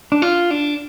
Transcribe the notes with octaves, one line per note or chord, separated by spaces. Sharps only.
D4
F4
D4